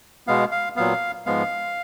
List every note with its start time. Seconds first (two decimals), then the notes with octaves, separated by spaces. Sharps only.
0.27 B2 G#3 B3 F5
0.52 F5
0.76 A#2 F#3 B3 F5
1.26 G#2 F3 G#3 B3 F5